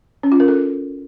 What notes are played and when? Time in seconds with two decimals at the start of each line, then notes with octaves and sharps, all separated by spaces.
0.23 C#4
0.32 F4
0.40 A#4
0.48 A4